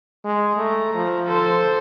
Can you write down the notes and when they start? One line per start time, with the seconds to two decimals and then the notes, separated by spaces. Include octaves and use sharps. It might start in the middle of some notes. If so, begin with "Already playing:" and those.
0.25 G#3
0.57 A3 A#5
0.94 F3
1.26 A4 C5